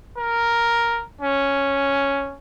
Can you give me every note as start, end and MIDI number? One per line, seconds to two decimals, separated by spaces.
0.18 1.04 70
1.21 2.35 61